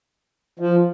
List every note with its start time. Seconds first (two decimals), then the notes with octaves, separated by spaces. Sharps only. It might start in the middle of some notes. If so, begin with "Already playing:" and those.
0.59 F3